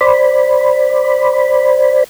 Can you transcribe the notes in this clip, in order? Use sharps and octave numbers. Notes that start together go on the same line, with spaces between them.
C5 D5 B5